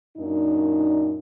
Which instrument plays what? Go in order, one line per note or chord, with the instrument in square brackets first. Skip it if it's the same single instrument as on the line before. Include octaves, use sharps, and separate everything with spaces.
[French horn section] F#2 A#2 D4 D#4